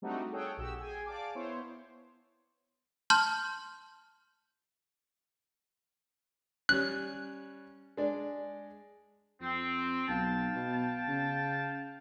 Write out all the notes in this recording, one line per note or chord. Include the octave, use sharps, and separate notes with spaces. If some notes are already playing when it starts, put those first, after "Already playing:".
G3 A3 C4 D4 D#4 F#4
G#4 A4 C#5 F#5 G5
A#1 F#4 G4 E6
G#4 G5 G#5
D5 F5 A5 D6
B3 E4 C5 C#5
A5 C6 F6 G6
G3 C#4 F#6
G#3 D4 D5
F2 C4
B1 F5 G5 A5
B2
C#3